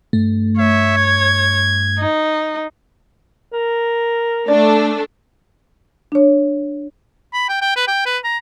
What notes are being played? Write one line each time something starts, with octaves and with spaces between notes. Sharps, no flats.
G2 A3
C#5 E5
G#6
D#4
A#4
A3 D4 D5
D4 C#5
B5
G5
G5
B4
G5
B4
A#5